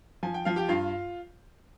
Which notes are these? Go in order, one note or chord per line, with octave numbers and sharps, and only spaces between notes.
F3 G#5
G5
F3 F5
G4 G5
G2 F4 F5